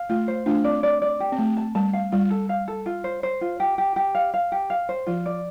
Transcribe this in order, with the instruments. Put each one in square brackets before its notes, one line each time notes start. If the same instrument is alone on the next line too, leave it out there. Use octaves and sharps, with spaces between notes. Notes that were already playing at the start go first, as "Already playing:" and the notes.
Already playing: [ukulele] F5
[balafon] A3 [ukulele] F4
[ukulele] C5
[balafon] A3 D4 [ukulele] F4
[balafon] C4 [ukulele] D5
[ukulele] D5
D5
G4
[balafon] C4
[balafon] A3 [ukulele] A5
[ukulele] A5
[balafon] G3 [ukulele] A5
[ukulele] F5
[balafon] G3 [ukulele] F4
[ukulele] A4
F5
A4
F4
C5
C5
F4
G4
G4
G4
F5
F5
G4
F5
C5
[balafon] F3 [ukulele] F4
[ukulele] D5